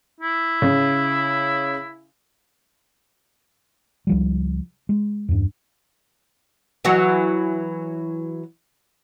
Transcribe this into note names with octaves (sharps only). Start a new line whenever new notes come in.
E4
C#3
C#2 F3 G3
G#3
E2 G2
E3 F#3 F#4